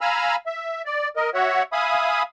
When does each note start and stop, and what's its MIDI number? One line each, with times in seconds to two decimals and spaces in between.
0.01 0.36 77
0.01 0.36 80
0.01 0.36 82
0.01 0.36 83
0.01 0.36 88
0.01 0.36 89
0.46 0.82 76
0.86 1.08 74
1.16 1.30 70
1.16 1.30 75
1.34 1.63 66
1.34 1.63 73
1.34 1.63 76
1.34 1.63 78
1.73 2.23 76
1.73 2.23 77
1.73 2.23 80
1.73 2.23 83
1.73 2.23 87